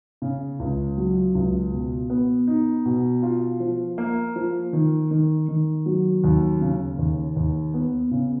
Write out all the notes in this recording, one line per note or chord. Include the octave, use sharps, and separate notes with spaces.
C#3
C#2
F#3
C#2
B2
B3
D#4
B2
F4
F3
A#3
F3
D#3
D#3
D#3
F#3
D#2
C#3
D#2
D#2
B3
C#3